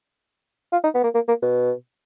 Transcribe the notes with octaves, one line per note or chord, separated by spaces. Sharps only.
F4
D#4
B3
A#3
A#3
A#3
B2